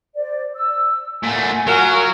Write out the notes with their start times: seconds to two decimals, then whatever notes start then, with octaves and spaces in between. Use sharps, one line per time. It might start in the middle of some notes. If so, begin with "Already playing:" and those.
0.16 C5 D5
0.55 E6
1.23 A#2 A3 F#5 G#5
1.67 F#3 F4 F#4 A#4